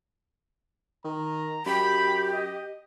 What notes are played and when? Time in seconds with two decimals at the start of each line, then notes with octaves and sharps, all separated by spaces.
1.05 D#3 A#5
1.66 F#2 G4 B5
2.32 D#5